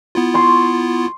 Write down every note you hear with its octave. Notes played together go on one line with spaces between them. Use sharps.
B3 E4 F4
C6 C#6